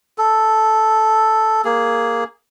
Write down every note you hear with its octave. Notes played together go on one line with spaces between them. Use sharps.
A4
A#3 G#4